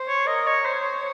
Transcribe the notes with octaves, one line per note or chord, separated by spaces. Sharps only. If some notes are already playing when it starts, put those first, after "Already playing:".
Already playing: C5
C#5
A#4 D#5
C#5
C5 C#5